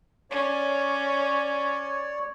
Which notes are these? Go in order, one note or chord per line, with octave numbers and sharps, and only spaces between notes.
C#4 C#5 D5